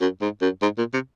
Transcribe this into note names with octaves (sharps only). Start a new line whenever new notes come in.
F#2
G#2
F#2
G#2
A#2
C3